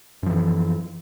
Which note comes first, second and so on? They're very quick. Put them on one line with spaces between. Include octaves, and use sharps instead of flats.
F#2 F3 E3